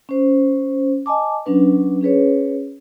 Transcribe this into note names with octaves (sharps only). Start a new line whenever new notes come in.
C#4 C5
D#5 G#5 A5 D6
F#3 C#4 D4 B4
C#4 G#4 B4 C#5